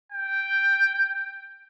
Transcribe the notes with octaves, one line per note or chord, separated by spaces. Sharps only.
G5